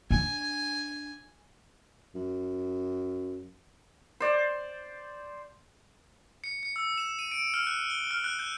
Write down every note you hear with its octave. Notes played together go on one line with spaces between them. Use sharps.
D4 G#5
F#2
C5 D5
C#7
C#7
E6
E7
D#7
D7
F6
F#6
G7
F6
F#6
G6